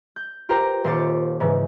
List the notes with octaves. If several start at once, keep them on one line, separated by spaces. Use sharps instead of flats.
G6
F4 G4 A#4 C5 G5 A#5
G5
D#1 C5 F5 D6 A6 C#7
G#2 C#3 E3